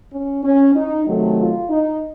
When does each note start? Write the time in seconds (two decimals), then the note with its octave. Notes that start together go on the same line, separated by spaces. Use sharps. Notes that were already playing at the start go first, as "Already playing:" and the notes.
0.11 C#4
0.43 C#4
0.75 D#4
1.07 C3 D#3 F#3 A3
1.39 F4
1.70 D#4